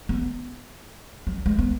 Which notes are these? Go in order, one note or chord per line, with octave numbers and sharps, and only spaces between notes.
B3
F#3
G#3
B3